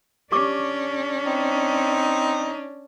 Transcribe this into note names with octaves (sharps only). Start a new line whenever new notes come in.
C#4 D4 G4 C#6 D6
C4 D#4